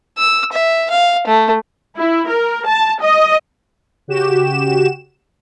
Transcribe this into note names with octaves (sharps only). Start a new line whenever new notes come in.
E6
E5
F5
A3
E4
A#4
A5
D#5
C#3 F#4 G4 E7